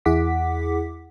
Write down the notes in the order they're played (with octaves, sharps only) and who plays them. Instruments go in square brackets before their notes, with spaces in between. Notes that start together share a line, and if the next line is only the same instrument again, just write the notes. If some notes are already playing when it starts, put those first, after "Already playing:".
[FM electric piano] E2 E4 G#4 F#5 D6 B6